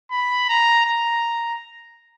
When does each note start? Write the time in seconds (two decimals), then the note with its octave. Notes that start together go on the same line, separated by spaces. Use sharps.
0.11 B5
0.49 A#5
0.86 A#5